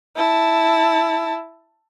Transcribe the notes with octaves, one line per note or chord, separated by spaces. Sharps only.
E4 A5